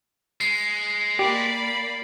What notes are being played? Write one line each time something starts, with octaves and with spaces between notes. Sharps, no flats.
G#3 C7
A#3 G4 D5 B5